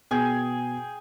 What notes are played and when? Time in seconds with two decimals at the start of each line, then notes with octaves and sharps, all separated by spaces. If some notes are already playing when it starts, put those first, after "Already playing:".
0.11 B2 G#4 G5 G#5